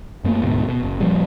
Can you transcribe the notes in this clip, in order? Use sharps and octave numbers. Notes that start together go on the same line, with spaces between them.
F#2 A3 A#3
D2 G#2 B2
B2
F#1
D#1 A#2 F3 G3